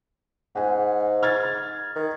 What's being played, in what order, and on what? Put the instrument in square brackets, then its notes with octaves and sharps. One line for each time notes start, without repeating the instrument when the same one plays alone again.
[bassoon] G#2 [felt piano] F#5 G#5
[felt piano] F6 G#6 A6
[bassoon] D#3